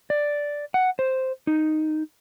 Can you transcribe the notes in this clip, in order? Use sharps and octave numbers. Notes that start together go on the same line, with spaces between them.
D5
F#5
C5
D#4